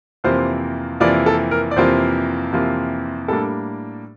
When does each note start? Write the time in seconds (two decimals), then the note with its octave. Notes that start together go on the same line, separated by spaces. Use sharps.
0.24 F2 C3 E3 A#3 F4 C5
1.00 F2 C3 E3 A#3 F4 D5
1.26 A4
1.51 A#4
1.71 D5
1.76 F2 C3 E3 A#3 F4 C5
2.53 F2 C3 E3 A#3 F4
3.28 A2 G3 A#3 D4 A4